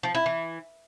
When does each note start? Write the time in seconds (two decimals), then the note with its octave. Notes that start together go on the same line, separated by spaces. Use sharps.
0.03 F3
0.15 E4
0.26 E3